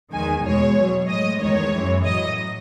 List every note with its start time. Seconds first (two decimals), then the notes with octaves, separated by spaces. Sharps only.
0.12 E2 D#3 G#3 G#5
0.44 E2 B2 G#3 C#5
0.76 B2 F#3
1.08 A2 G#3 D#5
1.41 E2 D#3 G#3 C#5
1.73 F#2 E3 G#3
2.04 A2 F#3 D#5